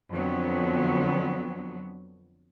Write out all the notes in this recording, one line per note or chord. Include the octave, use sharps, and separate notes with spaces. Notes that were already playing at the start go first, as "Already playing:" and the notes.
F2 D3 F#3 B3